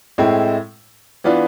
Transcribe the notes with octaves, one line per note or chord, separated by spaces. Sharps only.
A2 G#3 C4 E4
E3 B3 D4 F4